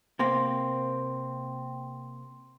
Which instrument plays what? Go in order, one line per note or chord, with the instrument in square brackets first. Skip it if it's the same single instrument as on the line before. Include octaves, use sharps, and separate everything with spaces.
[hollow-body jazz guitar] C3 A#3 C4 [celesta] C6